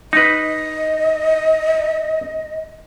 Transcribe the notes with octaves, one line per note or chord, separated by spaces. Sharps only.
D#4 B4 D#5